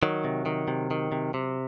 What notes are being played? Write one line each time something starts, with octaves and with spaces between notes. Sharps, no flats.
D#3 F#3
C3
D#3
C3
D#3
C3
C3